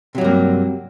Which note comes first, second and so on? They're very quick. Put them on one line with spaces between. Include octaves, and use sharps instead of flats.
C3 F#3 G2 A#3